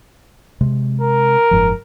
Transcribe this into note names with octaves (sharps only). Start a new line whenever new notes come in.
C3 G#3
A#4
F#1 G#2 F3